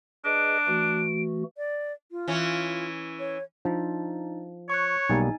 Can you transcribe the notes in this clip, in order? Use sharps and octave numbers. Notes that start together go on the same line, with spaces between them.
D4 G#4 B4 D#5 D7
E3 A3 F#4
D5
F4
E3 C#4
C#5
F3 D4 D#4
C#5 C#6 F#6
B1 G3 A#3 D#4 G#5